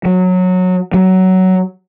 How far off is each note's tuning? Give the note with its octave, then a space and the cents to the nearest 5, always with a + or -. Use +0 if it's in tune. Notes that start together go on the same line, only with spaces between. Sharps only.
F#3 -15
F#3 +15